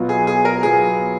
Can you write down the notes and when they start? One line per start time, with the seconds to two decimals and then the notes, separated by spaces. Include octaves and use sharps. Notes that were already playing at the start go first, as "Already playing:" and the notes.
Already playing: B2 F#3 B3 F4
0.09 G#4
0.27 G#4
0.45 A#4
0.63 B2 F#3 B3 F4 G#4